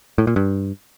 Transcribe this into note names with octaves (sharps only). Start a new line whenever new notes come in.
A2
A#2
G2